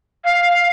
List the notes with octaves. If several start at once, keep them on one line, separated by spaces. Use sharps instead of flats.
F5